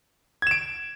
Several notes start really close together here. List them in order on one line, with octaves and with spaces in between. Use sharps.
G#6 E7 D7